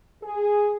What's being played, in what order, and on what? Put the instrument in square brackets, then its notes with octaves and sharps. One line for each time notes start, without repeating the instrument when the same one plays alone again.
[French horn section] G#4